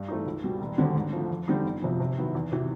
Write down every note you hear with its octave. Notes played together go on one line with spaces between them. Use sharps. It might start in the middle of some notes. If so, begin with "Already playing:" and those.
Already playing: G2
E3 A3 C4 D#4
C#2
B2 G3
E1
D#2 D3 G3 C4
G#2
F3 A3
F2
D3 G3 C4 D#4
G1
F2 C3 F3
C3
D#3 F#3 B3 E4
E2
C3 E3